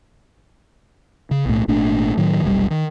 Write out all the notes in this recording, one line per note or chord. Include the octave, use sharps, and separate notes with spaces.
C#3
B1 A2
G#1 A#2 A3 D4
A2 D#3 F#3
F1 B1 B2 G3
D#3